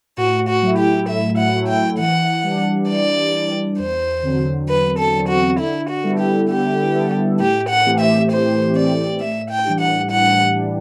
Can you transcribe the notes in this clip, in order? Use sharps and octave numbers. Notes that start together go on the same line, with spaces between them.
A2 F#4
F#4
F#3 A3 E4
G4
A2 E5
F#5
F#3 A3 E4
G5
E3 F#5
G3 D4
E3 D5
G3 D4
E2 C5
D3 F#3 C4
E2 B4
A4
D3 F#3 C4
F#4
D3 E4
F#4
G3 B3 E4 A4
G4
D3 G4
G3 B3 E4 A4
A2 G4
F#5
E3 A3 C4 G4
E5
A2 C5
E3 A3 C4 G4 D5
A2 E5
G5
E3 G3 D4 G4
F#5
A2 F#5
E3 G3 D4 G4